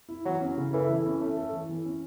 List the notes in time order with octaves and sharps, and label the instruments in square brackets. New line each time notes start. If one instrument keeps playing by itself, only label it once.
[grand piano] E4
[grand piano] E3 [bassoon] F#3
[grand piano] C#4
C#3
[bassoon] E3 [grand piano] A4
[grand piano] E3
C#4
[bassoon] A3 [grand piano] C#4
[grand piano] A4
E3
E3
C#4